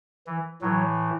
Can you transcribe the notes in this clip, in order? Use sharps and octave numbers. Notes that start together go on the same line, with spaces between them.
E3
A2 E3 F#3